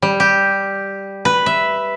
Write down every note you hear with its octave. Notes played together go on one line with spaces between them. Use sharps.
G3
G4
B4
E5